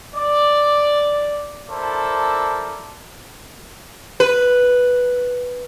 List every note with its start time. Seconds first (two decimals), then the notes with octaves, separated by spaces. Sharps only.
0.15 D5
1.69 E4 A4 A#4 C5 D5 A5
4.20 B4